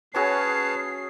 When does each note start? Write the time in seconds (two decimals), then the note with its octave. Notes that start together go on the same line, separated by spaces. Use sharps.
0.15 C#4 F#4 G#4 B4 C#5 A5 C7